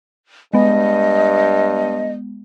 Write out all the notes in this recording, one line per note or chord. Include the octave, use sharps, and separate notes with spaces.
G2 G#3 B3 D#5